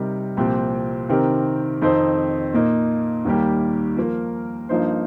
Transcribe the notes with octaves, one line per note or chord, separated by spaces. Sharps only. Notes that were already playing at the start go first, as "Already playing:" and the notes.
Already playing: C3 G3 D#4 A#4
C2 A#2 F3 C4 G4
C3 D#3 C4 G4 A#4
F2 D#3 C4 D#4 C5
A#2 A#3 D#4
D#2 D#3 G3 A#3 G4
F3 A#3 F4 A#4
G2 F3 A#3 D#4 C5